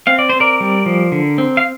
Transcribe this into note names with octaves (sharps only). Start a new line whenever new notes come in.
C4 F5
D5
C4 C5
A#4 D5
G3
F3
D3
C4
F5